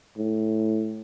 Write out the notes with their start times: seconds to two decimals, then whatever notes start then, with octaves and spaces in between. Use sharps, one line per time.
0.17 A2